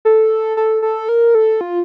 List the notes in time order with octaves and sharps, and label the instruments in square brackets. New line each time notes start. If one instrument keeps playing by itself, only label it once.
[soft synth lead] A4
A4
A4
A#4
A4
F4